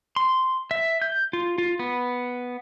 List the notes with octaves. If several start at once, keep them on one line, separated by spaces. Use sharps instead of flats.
C6
E5
G6
F4
F4
B3